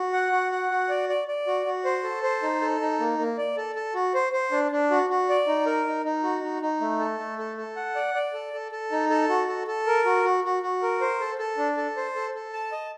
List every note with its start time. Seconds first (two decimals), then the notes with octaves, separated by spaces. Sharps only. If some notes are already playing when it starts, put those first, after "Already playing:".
Already playing: F#4
0.13 F#5
0.32 F#4
0.52 F#5
0.71 F#4
0.89 D5
1.09 D5
1.28 D5
1.47 F#4
1.66 F#4
1.85 C5
2.04 A4
2.23 C5
2.43 D#4
2.61 A4
2.81 D#4
3.00 A#3
3.19 A#3
3.38 D5
3.57 A4
3.76 A4
3.95 F#4
4.14 C5
4.33 C5
4.52 D4
4.72 D4
4.91 F#4
5.10 F#4
5.29 D5
5.47 D#4
5.66 A#4
5.86 D#4
6.05 D#4
6.23 F#4
6.43 D#4
6.62 D#4
6.81 A3
7.00 A4
7.19 A3
7.39 A4
7.57 A4
7.76 F#5
7.95 D5
8.14 D5
8.33 A4
8.53 A4
8.72 A4
8.92 D#4
9.10 A4
9.29 F#4
9.48 A4
9.67 A4
9.87 A#4
10.05 F#4
10.25 F#4
10.44 F#4
10.63 F#4
10.82 A#4
11.01 C5
11.20 A4
11.38 A4
11.58 D4
11.77 A4
11.97 C5
12.15 A4
12.35 A4
12.53 A5
12.72 D#5